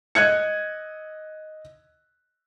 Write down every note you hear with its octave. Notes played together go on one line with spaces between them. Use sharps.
D#5 F#6 G#6 C#7